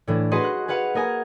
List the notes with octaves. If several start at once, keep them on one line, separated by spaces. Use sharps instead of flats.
A2 E3 D4
F#4 G#4 B4 D#5 F#5 C6
F#6
G#4 B4 F5 F#5
A#3 A#4 D#5 G#5